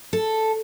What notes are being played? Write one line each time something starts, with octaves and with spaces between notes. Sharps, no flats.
A4